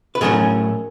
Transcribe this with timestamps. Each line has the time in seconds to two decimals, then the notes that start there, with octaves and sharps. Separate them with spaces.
0.15 B4
0.21 A2 F#3 A3 C#4 G#4 A#4